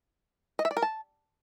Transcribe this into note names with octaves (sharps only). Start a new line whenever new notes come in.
D#5
E5
D5
A#4
A5